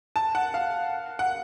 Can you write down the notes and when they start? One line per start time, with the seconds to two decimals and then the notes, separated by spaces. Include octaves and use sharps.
0.16 A5
0.35 F#5
0.54 F5
1.19 F#5